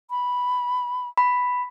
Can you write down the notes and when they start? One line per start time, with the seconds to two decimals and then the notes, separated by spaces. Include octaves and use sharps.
0.10 B5
1.18 B5